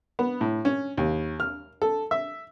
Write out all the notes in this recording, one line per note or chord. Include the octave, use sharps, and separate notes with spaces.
B3
A2
C#4
D#2
F6
A4
E5